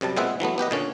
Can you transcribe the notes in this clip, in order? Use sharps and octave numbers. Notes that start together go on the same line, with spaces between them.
F#2 C3 G3 A5
A#2 G#3 B3 C4 E5 F#5
E3 F#3 A3 B3
B3 G4 B4 D#5
A#2 D3 C#4